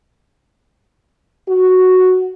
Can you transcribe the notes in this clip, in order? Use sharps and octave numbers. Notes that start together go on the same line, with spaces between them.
F#4